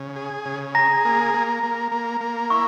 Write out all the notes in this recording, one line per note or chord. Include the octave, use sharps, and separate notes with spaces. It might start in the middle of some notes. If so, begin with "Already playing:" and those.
Already playing: C#3
G#4
C#3
G#4 A#5 A#6
A#3
A#3
A#3
A#3
A#3
E4 C#6